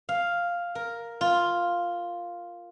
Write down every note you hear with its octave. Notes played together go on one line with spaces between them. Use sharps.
F5
A#4
F4